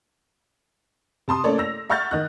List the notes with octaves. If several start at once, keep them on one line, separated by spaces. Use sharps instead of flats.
C3 A5 C6 D#6
A3 A#3 C#4 A4 C#5 D5
E6 A#6 F7
E5 F#5 C#6 F6 G6 A6
D#3 D#5 F#6